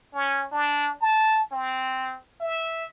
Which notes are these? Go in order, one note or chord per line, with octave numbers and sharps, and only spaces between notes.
C#4
D4
A5
C4
E5